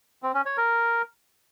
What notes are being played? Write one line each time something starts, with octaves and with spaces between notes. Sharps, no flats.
C4
C#4
C#5
A#4